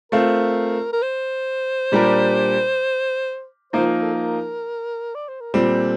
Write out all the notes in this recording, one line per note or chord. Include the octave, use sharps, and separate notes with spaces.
A3 C4 F4 A#4
A#4
C5
A#2 G3 D4 G4 A#4
F3 A#3 D#4 C5
A#4
A4
A#4
D5
C5
A#4
A#2 G3 C4 A4